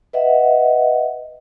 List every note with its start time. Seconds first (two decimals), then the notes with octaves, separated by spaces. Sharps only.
0.13 B4 D#5 E5 F#5